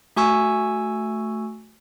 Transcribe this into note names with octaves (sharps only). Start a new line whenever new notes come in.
A3 F#4 G#5 C#6 E6